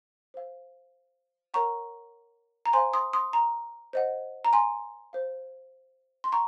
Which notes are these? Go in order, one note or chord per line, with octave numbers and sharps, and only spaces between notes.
C5 F5
A#4 C#5 F#5 A#5 C#6
A#5
C5 F5 G#5 C6
C6 D#6
C6 D#6
A#5
C5 D#5 F#5
A#5
G#5 C6
C5 F5
C6
F#5 A#5 C#6